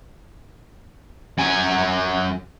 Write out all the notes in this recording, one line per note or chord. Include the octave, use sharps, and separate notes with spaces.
F#2 G#5